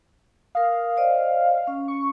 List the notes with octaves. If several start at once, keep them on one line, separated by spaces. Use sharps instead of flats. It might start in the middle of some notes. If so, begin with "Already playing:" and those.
A#4 F5 D#6
C5 D5 D#5
C#4
C#6